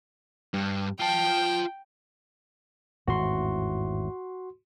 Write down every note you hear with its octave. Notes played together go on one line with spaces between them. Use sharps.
G2
F4 G5 A5
G#1 E2 A2 F#4 C6